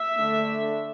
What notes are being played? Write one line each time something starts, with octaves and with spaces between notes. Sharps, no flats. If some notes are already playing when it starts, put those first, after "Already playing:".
Already playing: E5
D3 A3 D4